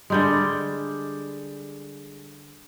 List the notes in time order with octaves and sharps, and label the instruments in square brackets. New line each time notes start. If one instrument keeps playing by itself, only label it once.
[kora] D3 G3 G#3